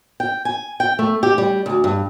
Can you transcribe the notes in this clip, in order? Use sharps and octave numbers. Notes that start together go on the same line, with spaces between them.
G5
G#5
G5
A3
G4
G3
D2
G2